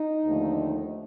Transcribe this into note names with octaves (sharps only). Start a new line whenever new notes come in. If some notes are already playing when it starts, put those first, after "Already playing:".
Already playing: D#4
D#2 D3 F3 A3